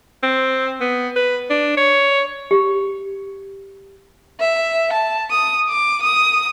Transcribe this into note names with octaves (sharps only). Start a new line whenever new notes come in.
C4
B3
B4
D4
C#5
G4
E5
A5
D#6
D6
D#6